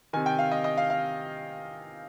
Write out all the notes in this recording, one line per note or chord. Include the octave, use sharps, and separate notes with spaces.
C3 D#3 G#5
G5
F5
D#5
D#5
F5
F5